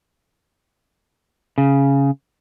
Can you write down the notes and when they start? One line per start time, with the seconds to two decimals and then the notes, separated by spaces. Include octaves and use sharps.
1.58 C#3